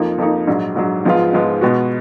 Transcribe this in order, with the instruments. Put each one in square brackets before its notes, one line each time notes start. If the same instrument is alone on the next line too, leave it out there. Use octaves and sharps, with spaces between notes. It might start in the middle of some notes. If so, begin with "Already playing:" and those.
Already playing: [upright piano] F2 F3 A#3 D#4
F2 F3 A#3 D#4
A#1 G#2 F#3
A#1 G#2 F#3
G#2 F3 G#3 B3 F4
G#2 F3 G#3 B3 F4
B2 G#3 B3 F#4